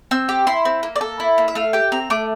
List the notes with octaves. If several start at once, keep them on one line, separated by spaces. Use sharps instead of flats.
C4 E6
G4
E4 C6
C4
A#3
D5
A4
E4
A#3
E5
A3 F5
G4 G5
C4 A#5
A3 D6